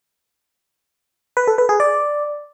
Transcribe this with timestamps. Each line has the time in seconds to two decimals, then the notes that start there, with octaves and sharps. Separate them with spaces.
1.37 B4
1.47 A4
1.58 B4
1.69 G#4
1.80 D5